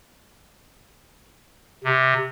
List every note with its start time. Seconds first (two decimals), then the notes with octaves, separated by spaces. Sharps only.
1.84 C3